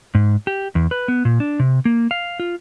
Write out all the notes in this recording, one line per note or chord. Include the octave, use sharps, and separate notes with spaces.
G#2
G4
E2
B4
B3
A#2
D4
C3
A#3
F5
F4